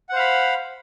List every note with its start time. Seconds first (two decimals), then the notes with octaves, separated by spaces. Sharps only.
0.09 F#5
0.12 C5
0.16 F5
0.19 B5